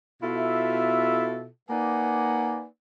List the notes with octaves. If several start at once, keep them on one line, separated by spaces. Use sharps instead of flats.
B2 E4 F4 A4 E5
A#3 D#4 B4 D5 F#5 G#5